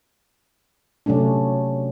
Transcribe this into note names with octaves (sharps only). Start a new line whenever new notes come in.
C3 F#3 A3 C#4 D4